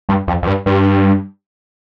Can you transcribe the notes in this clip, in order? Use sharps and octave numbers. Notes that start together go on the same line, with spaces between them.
G2
F2
F2
G2
G2